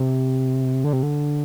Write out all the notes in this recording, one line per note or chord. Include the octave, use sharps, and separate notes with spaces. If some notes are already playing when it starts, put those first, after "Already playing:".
Already playing: C3
D3
C3
D3